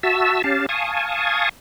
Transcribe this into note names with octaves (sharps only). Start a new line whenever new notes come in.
F#4 E5 A5 E6
C#4 G4 F5 A5
F5 G#5 A5 C#6 D#6